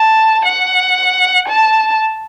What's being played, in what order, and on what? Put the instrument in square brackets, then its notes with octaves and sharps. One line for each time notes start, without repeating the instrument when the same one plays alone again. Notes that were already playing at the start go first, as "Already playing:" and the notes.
Already playing: [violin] A5
F#5
A5